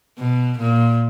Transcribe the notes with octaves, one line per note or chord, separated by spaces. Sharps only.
B2
A#2